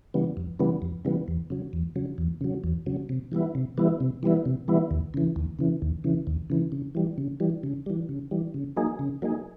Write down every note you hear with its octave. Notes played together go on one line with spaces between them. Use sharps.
C#3 E3 G3 B3
F2
C#3 E3 G3 B3
F2
C#3 E3 G3 B3
E2
C#3 F#3
E2
C#3 F#3
E2
C#3 F#3
E2
C#3 F#3
C3
E3 G3 B3 E4
C3
E3 G3 B3 E4
C3
E3 G3 B3 E4
C3
E3 G3 B3 E4
D#2
C#3 E3
D#2
C#3 E3
D#2
C#3 E3
D#2
C#3 E3
C#3
E3 G3
C#3
E3 G3
C#3
E3 G3
C#3
E3 G3
C#3
F#3 A#3 D#4 G#4
C#3
F#3 A#3 D#4 G#4